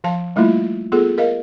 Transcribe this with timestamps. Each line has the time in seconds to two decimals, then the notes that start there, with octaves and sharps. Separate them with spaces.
0.04 F3 F5 A5
0.36 G3 A3 A#3 E4 F4
0.92 B3 F4 G#4 A4
1.18 A#4 D#5 F5